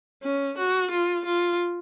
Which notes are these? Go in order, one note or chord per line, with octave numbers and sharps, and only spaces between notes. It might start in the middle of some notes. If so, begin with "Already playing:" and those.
C#4
F#4
F4
F4